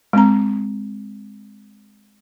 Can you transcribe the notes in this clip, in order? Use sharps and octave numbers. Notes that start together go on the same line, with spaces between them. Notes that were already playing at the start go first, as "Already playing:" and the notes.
G#3 C4 A#5